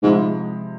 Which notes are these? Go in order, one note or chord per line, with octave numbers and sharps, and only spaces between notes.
G#2 C3 F3 G#3 E4